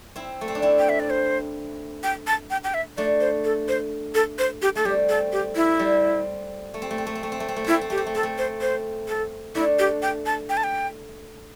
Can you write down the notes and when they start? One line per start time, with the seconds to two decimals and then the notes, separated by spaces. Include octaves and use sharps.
0.16 C4 E4
0.41 A3
0.48 C4
0.55 D4
0.62 C4 E4
0.79 G5
0.89 E5
1.00 D5
1.10 C5
2.04 G5
2.27 A5
2.50 G5
2.64 G5
2.74 E5
2.97 A3 D4 D5
3.21 C5
3.44 A4
3.68 C5
4.15 A4
4.39 C5
4.62 G4
4.75 A3 A4
4.85 G3 C4 G4
5.09 A4
5.32 G4
5.56 E4
5.79 G3 C4
6.74 A3
6.82 C4
6.90 A3
6.98 C4
7.07 A3
7.15 C4
7.23 A3
7.32 C4
7.40 A3
7.48 C4
7.56 A3
7.64 C4 E4
7.73 A3
7.81 C4
7.90 A3 G4
7.97 C4
8.06 A3
8.15 C4 A4
8.23 A3
8.38 C5
8.62 C5
9.08 A4
9.55 A3 D4 E4
9.79 G4
10.02 G5
10.26 A5
10.49 G5
10.57 A5
10.64 G5